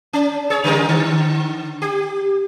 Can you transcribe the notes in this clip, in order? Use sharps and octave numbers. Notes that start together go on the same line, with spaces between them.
C#4
G#4 C#5
C#3 G3 A#4
D3
G4